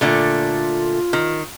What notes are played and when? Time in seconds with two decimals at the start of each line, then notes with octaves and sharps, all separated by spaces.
0.01 A#2 D3 A3 F4
1.13 D#3